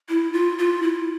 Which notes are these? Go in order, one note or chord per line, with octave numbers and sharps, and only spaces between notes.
E4
F4
F4
E4